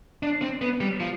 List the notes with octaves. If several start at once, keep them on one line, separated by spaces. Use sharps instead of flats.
D4
C4
B3
G3
F3